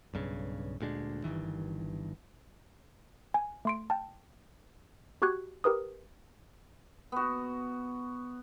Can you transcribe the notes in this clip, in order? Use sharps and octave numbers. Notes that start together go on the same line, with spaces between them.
B1 G2 C#3
D2 A#2 G#3 D4
G1 G2 D#3 E3
G#5
A3 C6 D7
G5 A5
F#4 G4 C#6 F#6 G#6
G4 A#4 B4 D#6
B3 F#4